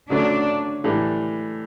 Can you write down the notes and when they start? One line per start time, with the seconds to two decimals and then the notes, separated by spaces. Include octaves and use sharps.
0.10 D3 F#3 A3 C#4 D4
0.84 A2 E3 G3 D4